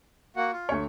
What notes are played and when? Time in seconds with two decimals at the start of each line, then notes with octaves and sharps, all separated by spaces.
0.36 A#3 F#4 F#5
0.53 F4
0.69 D2 C#5